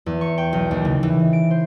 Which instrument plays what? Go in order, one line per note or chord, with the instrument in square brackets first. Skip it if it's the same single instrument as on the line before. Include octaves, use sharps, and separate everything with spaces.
[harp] E2
C#6
G5
B1
D#2
C#3
E3
D7
C5